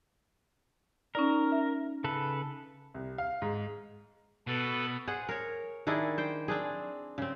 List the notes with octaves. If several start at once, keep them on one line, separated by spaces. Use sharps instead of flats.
C#4 D#4 A#4 D5
E5
C#3 A4 B4
C2
F5
G#2
B2 A4 B4
G#4 C5 F#5
A#4 C#5
D#3 D4 E4 G#4
C5 G5
C4 D4 G#4
C#3 C4